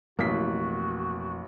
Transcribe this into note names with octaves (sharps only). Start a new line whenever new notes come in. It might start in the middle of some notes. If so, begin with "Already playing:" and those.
A1 F2 B2 A#3 F#4 B6